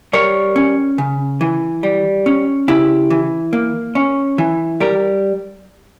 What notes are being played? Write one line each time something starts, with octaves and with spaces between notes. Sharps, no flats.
G3 A#4 C#5
C#4
C#3
E3
G3
C#4
C#3 E4 G4
E3
A#3
C#4
E3
G3 G4 A#4